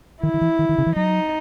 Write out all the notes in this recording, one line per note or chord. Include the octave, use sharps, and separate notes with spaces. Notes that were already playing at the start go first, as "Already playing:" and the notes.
D#3 E4
D#3
E3
D#3
D#3
C#3
E3
F#3 D#4